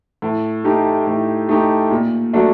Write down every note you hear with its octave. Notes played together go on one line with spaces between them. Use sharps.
A2
A3 D#4 G4
A2
A3 D#4 G4
A#2
F#3 A3 D4